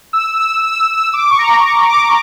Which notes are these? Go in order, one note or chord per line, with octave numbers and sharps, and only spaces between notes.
E6
E6
E6
E6
D6
C#6
A#5
C#6
D6